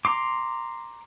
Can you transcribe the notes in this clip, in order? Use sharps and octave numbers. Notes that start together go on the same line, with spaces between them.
A#5 C6 D6